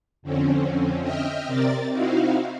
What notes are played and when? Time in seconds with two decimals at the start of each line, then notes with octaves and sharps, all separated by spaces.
0.22 F2 D3 C4 C#4
1.01 D#5 E5 G5 F6
1.47 C3 C4 A#4 D5 A6
1.90 C4 D#4 E4 F#4 F5